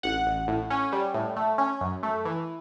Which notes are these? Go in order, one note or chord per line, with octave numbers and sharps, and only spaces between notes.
A1 F#5
A1
A2
C#4
G3
A2
A3
C#4
F#2
A3
E3